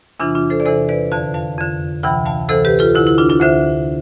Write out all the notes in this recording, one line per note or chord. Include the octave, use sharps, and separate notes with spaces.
E2 C3 E3 D4 F4
D4 F4
A4 C5
D5
E2 C3 E3 A4 C5
B4 D5
F2 D3 F5 A5
F5 A5
F2 D3
D2 C3 E3 G5 B5
F5 A5
D2 C3 E3 A4 C5
G4 B4
F4 A4
D2 D3 E4
E4
D4 F4
D4 F4
D2 D3 C5 E5